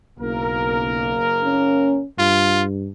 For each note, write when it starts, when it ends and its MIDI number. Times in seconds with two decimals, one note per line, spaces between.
0.19 1.99 30
0.19 1.20 35
0.19 1.99 58
0.19 1.99 70
1.43 2.06 61
2.19 2.90 43
2.19 2.64 65